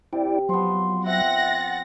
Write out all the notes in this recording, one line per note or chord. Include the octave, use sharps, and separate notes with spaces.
C3 E4 D5 G5
F3 F#3 B3 C6
C4 E5 F#5 A#6
F4 A6